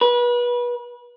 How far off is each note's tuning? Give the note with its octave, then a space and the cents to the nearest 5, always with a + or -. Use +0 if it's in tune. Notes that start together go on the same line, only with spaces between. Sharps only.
B4 -30